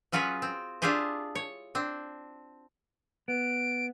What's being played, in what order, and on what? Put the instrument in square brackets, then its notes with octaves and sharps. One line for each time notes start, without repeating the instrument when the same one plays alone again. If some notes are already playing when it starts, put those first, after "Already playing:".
[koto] F#3 C#4 F4 F#4 G#4 B4
C4
D4 E4 F4 G4 G#4 C5
C#5
C4 D4
[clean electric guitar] B3 [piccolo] D7